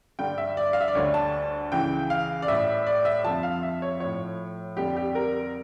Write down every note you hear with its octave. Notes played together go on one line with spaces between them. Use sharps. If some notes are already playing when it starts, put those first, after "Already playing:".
G2 D3 G3 G5
E5
D5
F5
E5
D5
D2 D3 G3 C#5
A5
C#2 C#3 E3 G5
F5
D5
A2 G3 E5
D5
E5
F2 D3 F3 A5
F5
E5
C#5
A2 F3 C#5
F2 D3 G3 G4
G4
A#4